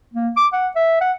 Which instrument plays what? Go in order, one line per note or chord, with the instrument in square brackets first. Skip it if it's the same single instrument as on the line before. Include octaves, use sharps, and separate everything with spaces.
[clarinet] A#3
D6
F#5
E5
F#5